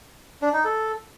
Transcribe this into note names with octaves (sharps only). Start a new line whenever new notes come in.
D4
D#4
A4